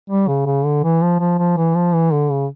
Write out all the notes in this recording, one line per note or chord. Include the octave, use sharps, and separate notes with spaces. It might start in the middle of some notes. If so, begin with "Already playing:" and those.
G3
C#3
C#3
D3
E3
F3
F3
F3
E3
F3
E3
D3
C#3